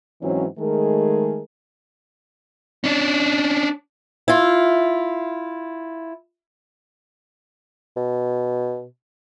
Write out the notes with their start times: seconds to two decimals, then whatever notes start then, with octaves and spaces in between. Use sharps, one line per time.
0.22 G#2 E3 F#3 C4 C#4 D#4
0.58 D#3 G#3 A3 G#4 A#4
2.84 C#4 D4
4.28 E4 F4
7.96 B2